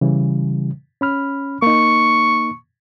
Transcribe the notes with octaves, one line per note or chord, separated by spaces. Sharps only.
C#3 E3 G3
C#4 B5 F6
A#3 D#4 C#6